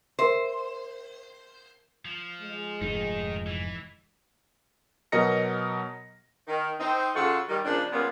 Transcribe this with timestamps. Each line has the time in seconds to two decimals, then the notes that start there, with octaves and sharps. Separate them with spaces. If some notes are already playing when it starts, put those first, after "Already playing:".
0.19 A#4 C5 E5
2.05 F3
2.41 G#3
2.81 F1 F2 G#2 D#3 D#4
3.46 E3
5.12 B2 F#3 A#4 D#5 A#6 C#7
6.48 D#3
6.79 C4 D#4
7.14 C#3 G#3 F4 F#4 A4
7.49 D#3 G3
7.65 C#3 F3 A#3 D4
7.92 A#2 G3 G#3 A#3 B3 C#4